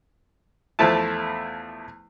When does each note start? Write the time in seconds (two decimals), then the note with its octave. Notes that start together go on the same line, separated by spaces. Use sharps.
0.79 E2 F3 A3 E4 A5